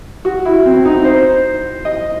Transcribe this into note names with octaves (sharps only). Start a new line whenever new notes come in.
F#4
E4
C4
D#4
C5
D#5